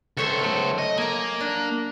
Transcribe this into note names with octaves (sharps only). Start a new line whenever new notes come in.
C#2 A4 C5 C#5 E5
F#3 A3
D#5
A#3 G#5 A#5
D4